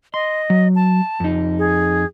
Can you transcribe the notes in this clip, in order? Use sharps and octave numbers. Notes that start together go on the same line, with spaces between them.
D#5 C6
F#3
A5
F2 D#4
G#4